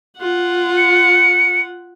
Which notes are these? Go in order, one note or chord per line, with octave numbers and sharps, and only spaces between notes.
F4 F#5
C#7